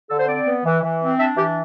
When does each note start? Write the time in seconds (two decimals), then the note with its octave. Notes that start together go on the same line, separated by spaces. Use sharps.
0.10 D3 A4
0.19 C5
0.28 C4 D5
0.47 B3
0.65 E3
0.83 E3
1.00 C4
1.19 D4 E5
1.37 E3 G4